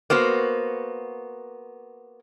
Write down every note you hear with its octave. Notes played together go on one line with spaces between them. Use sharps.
A#3 B3 F#4 C5